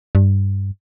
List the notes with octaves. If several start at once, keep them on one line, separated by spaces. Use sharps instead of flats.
G2